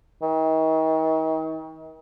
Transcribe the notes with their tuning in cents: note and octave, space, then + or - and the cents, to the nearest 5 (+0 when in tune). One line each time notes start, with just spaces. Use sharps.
D#3 +40